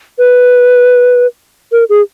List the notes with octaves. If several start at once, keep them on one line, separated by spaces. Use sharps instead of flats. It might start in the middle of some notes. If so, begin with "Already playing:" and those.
B4
A#4
G#4